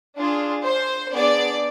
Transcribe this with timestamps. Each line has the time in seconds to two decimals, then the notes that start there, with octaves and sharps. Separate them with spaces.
0.18 D4 F4 G#4
0.65 C5
1.13 B3 D4 G#4 D5